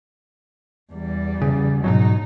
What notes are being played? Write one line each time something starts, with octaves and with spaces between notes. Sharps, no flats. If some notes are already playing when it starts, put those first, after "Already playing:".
E2 G3
C#3
G#2 B2 F#3 D#4